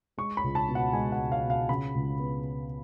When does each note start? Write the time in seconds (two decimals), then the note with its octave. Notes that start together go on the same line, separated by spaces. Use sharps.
0.17 G#3 C#6
0.37 B5
0.44 C#2
0.55 A5
0.68 B2
0.75 F#5
0.93 G#3 G#5
1.12 F#5
1.19 C#2
1.32 F5
1.44 B2
1.50 F5
1.69 C#3 B5
1.95 C#2
2.19 B3